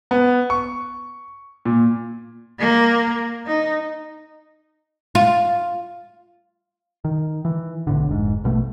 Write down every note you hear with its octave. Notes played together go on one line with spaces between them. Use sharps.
B3
C#6
A#2
A#3
D#4
F4
D#3
E3
B1 A2 D3
F1 G#2
A#1 B2 F3 A3